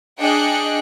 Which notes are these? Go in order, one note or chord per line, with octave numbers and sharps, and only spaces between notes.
D4 G#4 D#5 G5 F#6 C#7